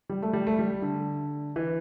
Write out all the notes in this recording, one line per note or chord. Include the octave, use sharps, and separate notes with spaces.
G3
A3
G3
A3
G3
D3
E3